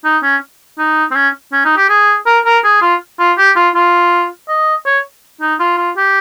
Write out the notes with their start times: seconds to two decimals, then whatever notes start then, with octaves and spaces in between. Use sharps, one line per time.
0.05 D#4
0.23 C#4
0.78 D#4
1.11 C4
1.16 C#4
1.53 C#4
1.65 D#4
1.77 G4
1.89 G#4
2.26 A#4
2.45 A#4
2.64 G#4
2.82 F4
3.20 F4
3.38 G4
3.56 F4
3.75 F4
4.49 D#5
4.86 C#5
5.41 D#4
5.60 F4
5.77 F4
5.97 G4